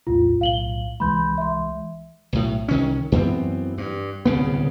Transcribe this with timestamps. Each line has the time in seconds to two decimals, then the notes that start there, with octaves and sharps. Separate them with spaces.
0.07 B1 E2 A2 F4
0.41 B1 A2 F5 F#7 G7
1.00 C2 E3 G#3 B5 C6 G6
1.38 E5 C6
2.33 B1 A2
2.68 C2 D#3 C#4
3.12 F#2 E3 B3 C4
3.78 G2
4.25 D1 C2 C#3 B3